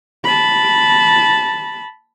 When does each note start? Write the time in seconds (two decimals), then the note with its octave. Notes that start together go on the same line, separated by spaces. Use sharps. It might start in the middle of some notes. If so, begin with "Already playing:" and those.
0.25 A5 B5